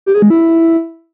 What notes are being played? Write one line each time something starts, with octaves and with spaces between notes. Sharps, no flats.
G4
G#4
G#3
E4